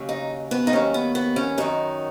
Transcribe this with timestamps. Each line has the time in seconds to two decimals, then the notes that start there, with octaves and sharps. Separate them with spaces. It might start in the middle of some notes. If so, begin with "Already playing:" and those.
Already playing: D#2 C#3 F#3
0.09 D#4
0.51 B3
0.67 D#4
0.73 D#2 D#3 F#3 C#4
0.94 B3
1.15 B3
1.36 C#4
1.58 F#2 D#3 F#3 D#4